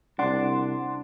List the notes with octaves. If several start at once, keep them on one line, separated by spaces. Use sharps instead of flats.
C2 D4 F#5 C6